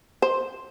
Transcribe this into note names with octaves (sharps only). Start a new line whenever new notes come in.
C5